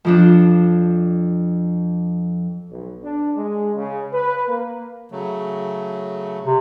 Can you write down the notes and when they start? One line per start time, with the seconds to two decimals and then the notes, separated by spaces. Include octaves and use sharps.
0.05 F2 F3 D4
2.71 B1
3.03 D4
3.36 G#3
3.76 C#3
4.13 B4
4.48 A#3
5.11 C#3 F#3 A3
6.46 C3